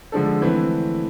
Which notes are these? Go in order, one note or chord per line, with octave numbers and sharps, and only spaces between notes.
D3 F3 G#3 D4 A4
E3 A3 C4 E4 B4